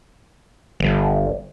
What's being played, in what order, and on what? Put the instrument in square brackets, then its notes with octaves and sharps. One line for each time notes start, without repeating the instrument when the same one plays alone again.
[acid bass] G1